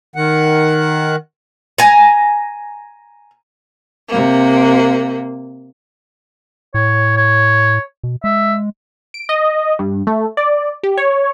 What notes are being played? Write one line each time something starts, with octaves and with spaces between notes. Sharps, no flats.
D#3 F#5
G#5 A#5
C3 A#3
A2 C#5
C#5
B2
G#3 E5
D7
D#5
G2
A3
D5
G4
C#5